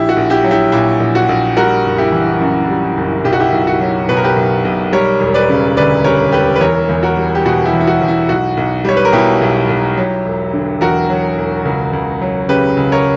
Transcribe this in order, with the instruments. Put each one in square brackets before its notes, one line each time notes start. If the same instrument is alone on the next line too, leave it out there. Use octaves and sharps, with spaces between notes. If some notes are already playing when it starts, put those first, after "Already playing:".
Already playing: [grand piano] A#1 E4 G4
F#4
A#1
E4 G4
F#3
E4 G4
A#2 E4
A#1
F#4
A#1
G3 F#4 A#4
F#1
E4 G4
E3
F#2
G3
F#1
B1 G4
F#4
E4 G4
B1
F#4
F#3
B2 B4
A#4
G4 B4
B1
B1
G3 A#4 C#5
E1
B4 D5
C#3
D2 B4 D5
G3 A#4 C#5
E1 G4 B4
B4
E2 A#4 C#5
E2
F#4 A#4
G3
G4
B2 F#4
E4 G4
E2
E4
F#4
E2
E4
B1 F#4
B1
G3 C#5
B4
A#4
B2 E4 G4
B1
B1
F#3
E1
D3
E2 F#4 A#4
F#3
E1
C#2
C#2
F#3
C#3 G4 B4
C#2
A#4 C#5